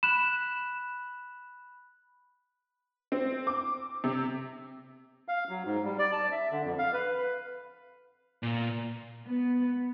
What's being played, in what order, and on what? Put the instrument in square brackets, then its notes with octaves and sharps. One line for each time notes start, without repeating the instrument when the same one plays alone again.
[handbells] B5 F#6 [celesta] E7
[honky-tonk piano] C4
D6
C3
[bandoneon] F5
F#3
G#2
G3
D5
A5
E5
D3
F2
F5
B4
[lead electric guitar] A#2
[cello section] B3